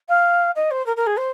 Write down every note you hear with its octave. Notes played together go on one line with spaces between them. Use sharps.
F5
D#5
C5
A#4
A#4
G#4
C5